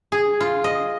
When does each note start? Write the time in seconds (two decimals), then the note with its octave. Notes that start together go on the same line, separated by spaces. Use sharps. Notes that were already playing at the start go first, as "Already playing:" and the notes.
0.12 G#4
0.40 F4
0.64 D#5